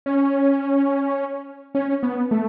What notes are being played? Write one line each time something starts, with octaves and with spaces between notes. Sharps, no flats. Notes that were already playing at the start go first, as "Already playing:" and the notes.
C#4
C#4
B3
A3